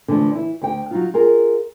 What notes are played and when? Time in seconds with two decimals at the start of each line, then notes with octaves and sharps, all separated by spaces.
0.08 D3 E3 F3 A3 D5
0.31 E3 E4
0.62 D2 G5
0.91 F#3 D#4 F4
1.14 F4 G#4 A#4